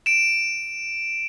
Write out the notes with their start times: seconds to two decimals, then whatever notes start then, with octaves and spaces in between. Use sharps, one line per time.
0.06 D7 E7